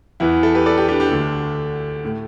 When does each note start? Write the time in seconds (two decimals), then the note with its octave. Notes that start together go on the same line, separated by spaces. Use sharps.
0.20 E2 E3 B3 E4
0.43 E4 A4
0.54 G4 B4
0.66 A4 D5
0.77 G4 B4
0.88 D4 G4
1.00 D4 G4
1.11 D2 D3 A3
2.05 A2 A3